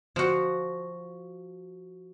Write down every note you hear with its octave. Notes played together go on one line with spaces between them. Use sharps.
F3 F#4